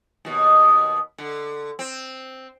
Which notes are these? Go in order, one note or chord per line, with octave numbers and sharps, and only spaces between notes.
D#2 B2
D3
C4